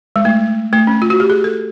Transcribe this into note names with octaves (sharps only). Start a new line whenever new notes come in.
G#3
A3
A3
C#4
F4
F#4
G4
G#4
A4